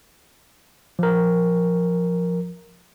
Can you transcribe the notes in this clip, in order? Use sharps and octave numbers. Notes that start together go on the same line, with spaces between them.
F3 A#4